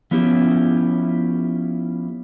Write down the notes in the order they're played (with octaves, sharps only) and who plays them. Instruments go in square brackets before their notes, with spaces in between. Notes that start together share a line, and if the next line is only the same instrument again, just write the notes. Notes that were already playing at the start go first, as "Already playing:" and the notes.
[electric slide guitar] F3 B3 C#4 E4 G4